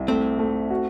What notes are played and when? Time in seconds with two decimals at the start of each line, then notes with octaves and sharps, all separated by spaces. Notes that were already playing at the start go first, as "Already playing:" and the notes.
Already playing: C2
0.08 A3 C4
0.39 A3
0.70 F#4